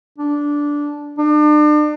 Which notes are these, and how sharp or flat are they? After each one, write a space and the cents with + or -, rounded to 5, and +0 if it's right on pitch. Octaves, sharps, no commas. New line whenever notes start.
D4 -10
D4 +40